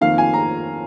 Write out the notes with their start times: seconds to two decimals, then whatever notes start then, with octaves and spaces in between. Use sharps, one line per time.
0.01 F2 D#3 A#3 F5
0.18 G#5
0.34 A#5